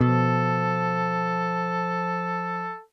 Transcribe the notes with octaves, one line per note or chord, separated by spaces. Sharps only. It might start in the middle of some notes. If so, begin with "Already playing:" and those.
B2 F3 A4